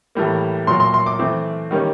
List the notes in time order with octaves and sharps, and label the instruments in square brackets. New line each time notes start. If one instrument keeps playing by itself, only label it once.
[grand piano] A2 E3 G3 A#3
A#2 F#3 A#3 C6
C6
C6
D6
E3 A3 C4
D#3 G3 A#3 C#4